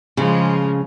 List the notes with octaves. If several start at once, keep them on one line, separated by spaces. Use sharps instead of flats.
C#3 F3 G#3